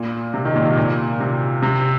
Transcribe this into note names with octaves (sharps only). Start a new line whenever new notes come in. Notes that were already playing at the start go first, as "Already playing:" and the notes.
Already playing: A#2
C3
D#3
A#2
C3
A#2
C3
C3